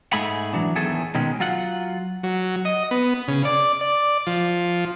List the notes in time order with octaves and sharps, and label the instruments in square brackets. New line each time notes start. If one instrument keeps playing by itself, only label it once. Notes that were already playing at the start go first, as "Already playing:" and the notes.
[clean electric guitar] G#2 A3 G#4 B5
E3 F#3 D4
E2 A2 D#3 A3 G#4 A4
B2 D#3 G#3 C#4
F#3 F4 F#5
[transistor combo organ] F#3
D#5
B3
C#3
D5
D5
F3